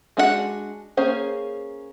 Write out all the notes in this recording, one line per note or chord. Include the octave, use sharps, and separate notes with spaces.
G#3 D4 F#4 A4 F#5
A#3 C#4 G#4 C5